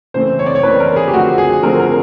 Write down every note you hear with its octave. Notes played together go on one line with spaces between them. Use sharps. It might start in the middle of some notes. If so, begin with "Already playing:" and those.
C#3 E3 A3 C4 C5
C#5
D5
C#5
C#3 E3 A3 C4 B4
A#4
G#4
G4
D3 F3 A3 C4 F#4
G#4
D3 F3 A3 C4 A#4
A#4